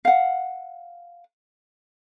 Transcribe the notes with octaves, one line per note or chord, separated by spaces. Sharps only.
F5 F#5